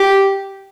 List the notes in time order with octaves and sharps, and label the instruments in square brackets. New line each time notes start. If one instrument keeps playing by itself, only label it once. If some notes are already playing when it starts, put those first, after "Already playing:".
Already playing: [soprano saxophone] G4